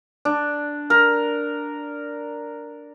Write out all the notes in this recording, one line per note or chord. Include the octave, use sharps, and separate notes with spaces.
D4
A#4